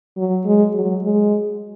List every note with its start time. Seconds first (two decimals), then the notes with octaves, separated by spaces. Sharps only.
0.17 F#3
0.45 G#3
0.75 F#3
1.04 G#3